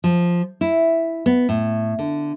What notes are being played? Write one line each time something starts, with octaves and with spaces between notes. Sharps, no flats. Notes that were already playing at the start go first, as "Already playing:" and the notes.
F3
E4
B3
A2
D3